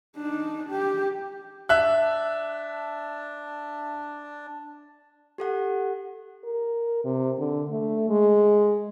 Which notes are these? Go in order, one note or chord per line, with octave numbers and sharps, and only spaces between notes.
D4 D#4
G4
D4 E5 F#6
G4 A4 F#5
A#4
C3
D3
A3
G#3